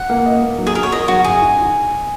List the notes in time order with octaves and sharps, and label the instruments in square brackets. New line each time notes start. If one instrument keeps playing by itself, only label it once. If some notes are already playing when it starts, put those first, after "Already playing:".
Already playing: [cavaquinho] F#5
[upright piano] A#3
D#5
A#3
F#3
[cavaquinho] G#4
[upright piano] F#4 [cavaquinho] A#4
[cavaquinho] C#5
[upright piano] A#4 [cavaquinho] D#5
[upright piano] F#3 [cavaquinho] F#4
[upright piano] F#2 [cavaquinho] G#4
[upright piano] D#4